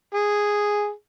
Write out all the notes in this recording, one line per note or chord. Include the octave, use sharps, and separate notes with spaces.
G#4